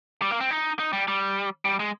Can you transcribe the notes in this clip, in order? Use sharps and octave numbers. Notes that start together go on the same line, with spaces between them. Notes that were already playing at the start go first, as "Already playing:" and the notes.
G3
A#3
C4
D#4
D#4
G3
G3
G3
G#3